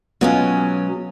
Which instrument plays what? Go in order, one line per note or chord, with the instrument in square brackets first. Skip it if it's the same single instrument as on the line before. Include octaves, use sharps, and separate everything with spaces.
[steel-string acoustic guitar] B2 G#3 C#4 [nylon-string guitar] F#3 B3 F4